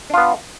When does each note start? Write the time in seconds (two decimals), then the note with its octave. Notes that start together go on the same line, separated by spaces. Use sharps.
0.10 D4
0.14 F4
0.18 B3